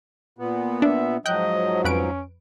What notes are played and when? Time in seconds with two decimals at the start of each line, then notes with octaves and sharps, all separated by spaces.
0.38 A#2 B3
0.82 D4 E5
1.26 G#2 F3 F#3 D#5 G5 F#6 G6
1.84 F2 C#4 B4 D7